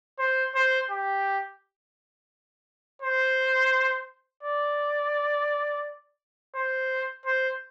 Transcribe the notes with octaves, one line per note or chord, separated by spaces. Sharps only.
C5
C5
G4
C5
D5
C5
C5